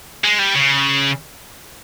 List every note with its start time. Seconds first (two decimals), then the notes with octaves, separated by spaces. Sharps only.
0.24 G#3
0.39 G3
0.55 C#3